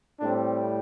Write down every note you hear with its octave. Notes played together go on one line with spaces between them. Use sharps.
A2 G3 C4 D4